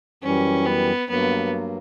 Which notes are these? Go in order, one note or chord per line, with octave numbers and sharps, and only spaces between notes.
F#2 E3 G3 C#4
B3
G2 F#3 A#3 B3